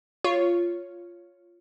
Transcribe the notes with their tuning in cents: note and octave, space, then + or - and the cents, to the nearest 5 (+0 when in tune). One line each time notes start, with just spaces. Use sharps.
F4 -5 C#5 +0